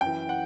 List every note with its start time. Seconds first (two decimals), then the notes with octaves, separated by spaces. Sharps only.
0.01 F#2 E3 G5
0.29 F#5